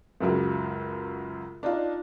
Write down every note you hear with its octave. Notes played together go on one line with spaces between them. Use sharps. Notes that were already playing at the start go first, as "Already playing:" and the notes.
C#2 F#2 C#3 F#3
D4 D#4 F4